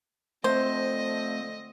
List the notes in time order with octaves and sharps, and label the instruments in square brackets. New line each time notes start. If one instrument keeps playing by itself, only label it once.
[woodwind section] D3 F3 C4 [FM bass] A3 [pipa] C5 [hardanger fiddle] D#5